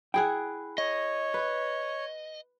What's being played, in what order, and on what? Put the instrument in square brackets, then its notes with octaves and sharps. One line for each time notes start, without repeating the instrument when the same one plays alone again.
[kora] E4 G#4 F#5 [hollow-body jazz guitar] G5
[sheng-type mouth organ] C#5 [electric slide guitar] D#5
[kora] B4